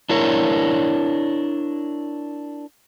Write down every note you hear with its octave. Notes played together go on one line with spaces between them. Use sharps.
D4 E4 A#4 C#5